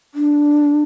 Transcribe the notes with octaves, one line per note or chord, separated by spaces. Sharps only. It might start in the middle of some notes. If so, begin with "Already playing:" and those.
D4